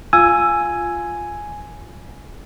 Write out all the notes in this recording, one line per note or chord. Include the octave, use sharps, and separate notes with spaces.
F4 G#5 E6